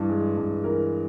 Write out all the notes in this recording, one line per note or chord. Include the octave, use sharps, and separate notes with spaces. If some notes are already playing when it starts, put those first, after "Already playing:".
Already playing: G2 E3
G#3
G2
E3 A#4